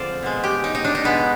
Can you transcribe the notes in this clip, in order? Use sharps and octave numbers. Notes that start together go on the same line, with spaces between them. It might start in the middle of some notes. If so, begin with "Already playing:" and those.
Already playing: D3 F3 G#3 C4 F4 C5 D5
B2 G#3
G4
D#4
D#4
D4
D#4
B2 G#3 B3